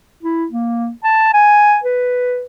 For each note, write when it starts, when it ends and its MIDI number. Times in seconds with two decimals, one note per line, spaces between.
0.23 0.47 64
0.52 0.90 58
1.04 1.30 81
1.34 1.79 80
1.84 2.45 71